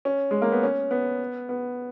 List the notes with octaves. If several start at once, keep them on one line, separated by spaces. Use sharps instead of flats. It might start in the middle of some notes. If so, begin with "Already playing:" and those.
C#4
G#3
A#3
B3
C#4
B3
B3